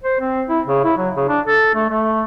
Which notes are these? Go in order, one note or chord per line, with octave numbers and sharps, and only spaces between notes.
C5
C4
E4
C#3
E4
F#3
C#3
D4
A4
A3
A3